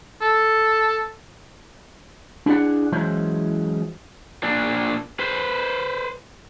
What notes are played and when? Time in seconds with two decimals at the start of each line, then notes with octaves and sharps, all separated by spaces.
0.21 A4
2.46 D4 E4 G#4 D5 F#5
2.92 E3 F#3 G#3 C#4 E4 C5
4.43 A#2 D4
5.19 B4 C5